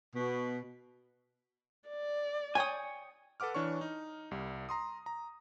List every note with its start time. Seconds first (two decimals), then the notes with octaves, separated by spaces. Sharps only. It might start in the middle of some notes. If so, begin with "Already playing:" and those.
0.15 B2
1.88 D5
2.55 C#5 G5 G#5 D#6
3.40 A4 B4 F#5 D6 F6
3.54 E3 D4 C#5 C#6
3.81 D#4
4.31 C2 G3
4.69 A#5 C6 D#6
5.06 A#5